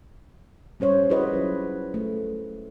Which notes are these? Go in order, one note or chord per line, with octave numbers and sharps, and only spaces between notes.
G3 C#4 C5 C#5
E4 F#4 G#4 B4 C5 D#5
F#3 C#4 F4
A3